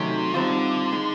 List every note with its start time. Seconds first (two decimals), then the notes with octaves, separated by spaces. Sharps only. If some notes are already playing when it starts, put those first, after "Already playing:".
Already playing: C3 D#3 F#3 A3 C#4 F#4
0.34 D3 D#3 G3 C4 F4
0.92 D#3 G#3